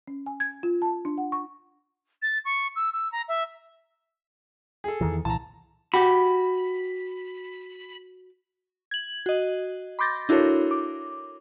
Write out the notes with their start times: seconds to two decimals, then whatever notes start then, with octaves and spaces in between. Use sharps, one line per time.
0.08 C#4
0.26 G#5
0.40 G#6
0.63 F4
0.82 A5
1.05 D4
1.18 F#5
1.32 C#6
2.22 A6
2.45 C#6
2.76 E6
2.93 E6
3.12 A#5
3.28 E5
4.84 G#4 A4
5.01 E2 D#3 E3
5.25 C2 A#2 E3 A5 A#5
5.94 F#4 G4 B5
8.91 G#6 F#7
9.26 F#4 D#5
9.99 B5 C6 D6 G6 A6 A#6
10.29 D4 E4 F#4 A4 A#4 C#5
10.71 D6